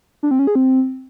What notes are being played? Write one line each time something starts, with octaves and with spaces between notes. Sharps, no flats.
D4
C4
C#4
G#4
C4